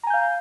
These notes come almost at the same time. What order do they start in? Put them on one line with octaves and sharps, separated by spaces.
A#5 G#5 G6 F5